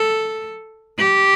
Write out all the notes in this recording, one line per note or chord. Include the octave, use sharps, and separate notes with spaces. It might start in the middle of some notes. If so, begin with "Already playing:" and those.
Already playing: A4
G4